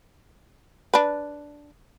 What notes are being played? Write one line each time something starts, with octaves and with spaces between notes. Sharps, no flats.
D4 B4